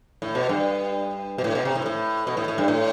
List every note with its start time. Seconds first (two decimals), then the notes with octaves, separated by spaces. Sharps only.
0.22 A2
0.35 B2
0.49 G2
1.38 B2
1.44 A2
1.55 B2
1.65 C3
1.75 A2
1.86 A2
2.27 B2
2.37 A2
2.48 A2
2.58 G2
2.68 A2